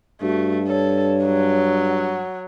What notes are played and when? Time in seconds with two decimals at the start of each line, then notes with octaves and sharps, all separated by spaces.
0.22 G2 A3 F#4
0.68 A4 C#5
1.26 F#3
1.89 F#5